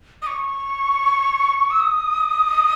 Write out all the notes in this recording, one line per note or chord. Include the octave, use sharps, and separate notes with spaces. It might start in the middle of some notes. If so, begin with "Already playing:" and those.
D#6
C#6
E6
D#6